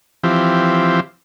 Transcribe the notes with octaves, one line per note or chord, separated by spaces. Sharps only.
E3 F3 C4 G4